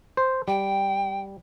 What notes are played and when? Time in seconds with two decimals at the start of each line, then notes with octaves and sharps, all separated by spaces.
0.17 C5
0.48 G3 G5